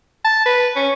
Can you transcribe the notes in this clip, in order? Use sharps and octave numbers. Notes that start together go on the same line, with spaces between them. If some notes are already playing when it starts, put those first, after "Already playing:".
A5
B4
C#4